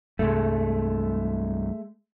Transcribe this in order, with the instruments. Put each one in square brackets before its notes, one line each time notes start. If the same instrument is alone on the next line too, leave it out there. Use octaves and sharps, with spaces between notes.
[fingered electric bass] C2 G2 [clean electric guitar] G#3 A3